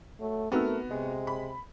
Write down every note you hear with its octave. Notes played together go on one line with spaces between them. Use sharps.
F#3 A3
A3 B3 C4 D#4 F#4 A#4 E6
C3 G#3
B5